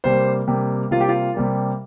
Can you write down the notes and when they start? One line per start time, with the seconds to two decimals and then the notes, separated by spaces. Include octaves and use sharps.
0.04 C3 G3 A#3 C5
0.47 C3 G3 A#3
0.91 C3 G3 A#3 F4
1.00 G4
1.09 F4
1.34 C3 G3 A#3